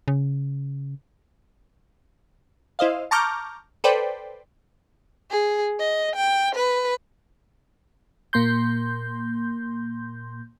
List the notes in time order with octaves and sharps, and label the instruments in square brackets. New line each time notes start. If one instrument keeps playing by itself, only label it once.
[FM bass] C#3
[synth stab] E4 C5 D#5 F5
A5 A#5 C#6 D6 F6 G6
A4 B4 C5 D5 G5
[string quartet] G#4
D#5
G5
B4
[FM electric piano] A#2 A#3 C6 G6